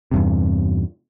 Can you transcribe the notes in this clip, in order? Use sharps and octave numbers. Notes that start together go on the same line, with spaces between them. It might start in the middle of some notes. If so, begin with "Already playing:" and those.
E2 G2 C3